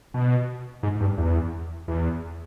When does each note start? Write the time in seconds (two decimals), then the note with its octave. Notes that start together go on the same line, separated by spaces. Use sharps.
0.14 B2
0.83 G#2
1.01 G2
1.18 E2
1.88 E2